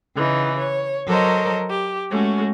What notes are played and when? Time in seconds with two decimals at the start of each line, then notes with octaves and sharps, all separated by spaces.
0.16 C#3 E3 D#4
0.58 C#5
1.07 F#3 A4 A#4 C5 C#5 D#5
1.68 G4
2.11 G#3 A3 C#4 F#4